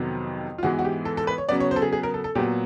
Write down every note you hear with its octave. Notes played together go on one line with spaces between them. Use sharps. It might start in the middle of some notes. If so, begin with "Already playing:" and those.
Already playing: F2 C3 D#3 F#3 B3
F4
G#2 E3 G#3 B3 F#4
F#4
G4
A4
A4
B4
C#5
C#3 F#3 B3 D5
C#5
C5
A4
G#4
G#4
A#4
A4
A4
A#2 F#3 B3 G4